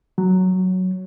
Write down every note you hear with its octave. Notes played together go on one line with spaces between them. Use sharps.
F#3